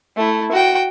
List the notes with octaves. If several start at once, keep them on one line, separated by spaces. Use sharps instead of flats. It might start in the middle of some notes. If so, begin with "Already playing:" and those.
A3 E4
F#4 G5